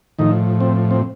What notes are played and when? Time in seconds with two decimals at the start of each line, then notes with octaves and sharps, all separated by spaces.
0.19 A2 D#3 F3 D#4
0.60 C4
0.91 C4